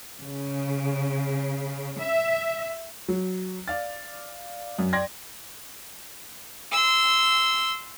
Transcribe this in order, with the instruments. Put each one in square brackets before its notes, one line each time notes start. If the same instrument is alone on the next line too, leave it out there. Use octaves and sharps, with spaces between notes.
[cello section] C#3
E5
[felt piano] F#3
D5 F5 A6
F#2
D5 G5 C6 G#6 A#6
[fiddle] C6 E6